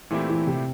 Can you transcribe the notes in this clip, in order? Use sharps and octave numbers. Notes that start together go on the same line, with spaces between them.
A#2 E3 A3 C4 E4 G4
E3
C3